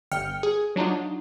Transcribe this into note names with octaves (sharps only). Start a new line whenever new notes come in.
G1 G5 F6 C#7
G#4
F#3 D4 D#4 F4